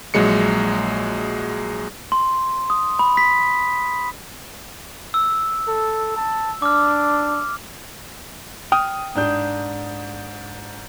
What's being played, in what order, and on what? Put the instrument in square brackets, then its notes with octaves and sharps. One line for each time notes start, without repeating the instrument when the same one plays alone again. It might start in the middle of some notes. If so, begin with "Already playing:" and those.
[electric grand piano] A#1 F#3 G#3 C#7
[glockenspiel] C6
D#6
B5
B6
E6
[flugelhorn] A4
A5
[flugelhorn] D4 [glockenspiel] D6 F6
[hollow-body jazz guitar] G5 [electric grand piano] D#6 F6
[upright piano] G#2 D4 G6